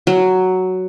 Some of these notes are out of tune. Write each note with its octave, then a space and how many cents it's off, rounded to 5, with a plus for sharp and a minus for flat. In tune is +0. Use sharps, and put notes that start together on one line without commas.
F#3 +5